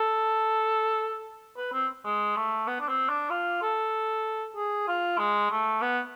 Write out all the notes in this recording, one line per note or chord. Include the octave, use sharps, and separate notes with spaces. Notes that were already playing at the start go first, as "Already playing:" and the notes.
Already playing: A4
B4
C4
G#3
A3
B3
D4
C4
D4
F4
A4
G#4
F4
G#3
A3
B3